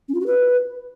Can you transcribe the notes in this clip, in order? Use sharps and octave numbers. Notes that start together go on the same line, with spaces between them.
C#4
F4
F#4
B4